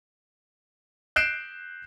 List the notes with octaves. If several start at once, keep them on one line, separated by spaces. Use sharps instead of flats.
F#6 G6 C7 D7 E7